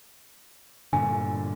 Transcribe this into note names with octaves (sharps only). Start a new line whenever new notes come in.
G2 A#2 D3 G#5